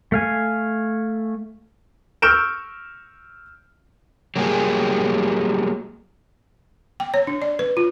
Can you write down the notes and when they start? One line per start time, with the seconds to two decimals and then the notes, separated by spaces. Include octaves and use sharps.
0.12 A3 F5 G#5
2.22 C#6 E6 F6 G6 D7 E7
4.36 F#3 G3 A#3 G4 G#4
7.00 G5
7.14 C#5
7.27 D4
7.42 D5
7.59 B4
7.77 F4